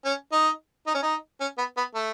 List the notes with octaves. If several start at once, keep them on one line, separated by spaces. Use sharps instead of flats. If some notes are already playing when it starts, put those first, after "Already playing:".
C#4
D#4
D#4
C#4
D#4
C#4
B3
B3
A3